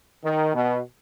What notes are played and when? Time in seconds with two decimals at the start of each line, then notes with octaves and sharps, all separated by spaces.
0.24 D#3
0.54 B2